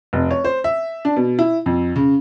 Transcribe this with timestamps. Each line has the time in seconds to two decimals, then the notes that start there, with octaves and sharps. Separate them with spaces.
0.13 F1
0.31 C#5
0.44 C5
0.64 E5
1.05 D4
1.16 B2
1.39 E4
1.66 F2
1.96 C#3